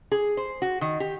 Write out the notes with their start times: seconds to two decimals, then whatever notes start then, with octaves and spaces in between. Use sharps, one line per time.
0.12 G#4
0.37 C5
0.62 F#4
0.81 D#3
1.00 G4